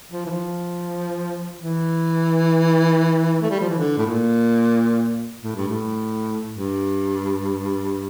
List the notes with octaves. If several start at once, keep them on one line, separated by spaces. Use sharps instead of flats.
F3
E3
F3
E3
A3
G3
F3
E3
D3
A2
A#2
A2
G2
A2
G2